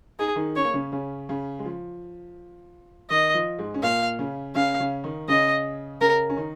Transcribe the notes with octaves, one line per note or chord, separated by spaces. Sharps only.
D#4 G#4
D#3 D#4
C#4 C#5
A#3
C#3 C#4
C#3 C#4
C#3 C#4
G#3
F3
D#3 D#5
F3
G#2 G#3
C#4
A#2 A#3 F5
C#3 C#4
C#3 C#4 F5
C#3 C#4
D#3 D#4
C#3 C#4 D#5
C#3 C#4 A#4
C#4
D#3 D#4